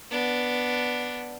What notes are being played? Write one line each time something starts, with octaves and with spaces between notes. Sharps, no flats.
B3 D4